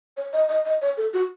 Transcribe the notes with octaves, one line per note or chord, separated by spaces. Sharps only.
C#5
D#5
D#5
D#5
C#5
A4
F#4